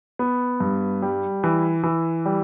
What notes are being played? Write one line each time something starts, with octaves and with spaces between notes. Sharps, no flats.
B3
G2
G3
E3
E3
G3